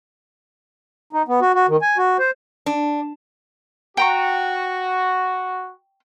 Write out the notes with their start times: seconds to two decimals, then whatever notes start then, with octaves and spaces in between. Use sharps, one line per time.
1.13 D#4
1.28 B3
1.41 F#4
1.54 F#4
1.68 D#3
1.82 G#5
1.97 F#4
2.19 C5
2.66 D4
3.97 F#4 G5 A#5 C#6